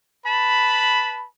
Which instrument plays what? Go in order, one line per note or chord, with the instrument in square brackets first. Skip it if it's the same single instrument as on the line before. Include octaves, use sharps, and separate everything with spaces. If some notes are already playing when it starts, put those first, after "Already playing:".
[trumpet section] B4 A5 B5